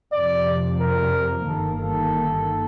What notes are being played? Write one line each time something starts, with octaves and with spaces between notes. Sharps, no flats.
F2 C3 F3 D5
A#4
G1 G2 D#3 A#3 A4
A4